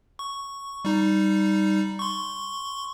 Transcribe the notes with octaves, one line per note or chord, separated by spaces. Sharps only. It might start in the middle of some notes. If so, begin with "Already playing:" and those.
C#6
G3 D#4
C6 C#6